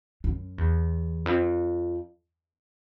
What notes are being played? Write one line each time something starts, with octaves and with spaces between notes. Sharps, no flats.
F#2
E2
F2